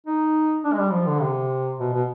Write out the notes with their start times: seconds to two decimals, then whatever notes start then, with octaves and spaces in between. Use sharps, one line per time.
0.06 D#4
0.64 D4
0.73 G#3
0.78 G3
0.92 F3
1.07 D3
1.21 C3
1.80 B2
1.94 B2